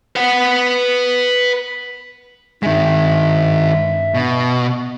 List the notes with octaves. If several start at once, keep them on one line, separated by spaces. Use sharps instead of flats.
B4 F#5
G2 D#3 G#3 E5
B2